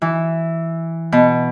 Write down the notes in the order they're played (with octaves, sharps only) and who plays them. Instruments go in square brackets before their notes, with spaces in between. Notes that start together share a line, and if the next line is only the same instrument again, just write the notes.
[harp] E3
B2